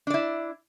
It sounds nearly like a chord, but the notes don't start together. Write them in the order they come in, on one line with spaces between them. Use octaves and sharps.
D4 D5 E4